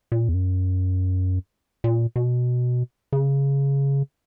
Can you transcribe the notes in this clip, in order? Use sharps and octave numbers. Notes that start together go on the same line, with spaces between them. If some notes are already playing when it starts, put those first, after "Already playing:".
A#2
E2
F#2
A#2
B2
C#3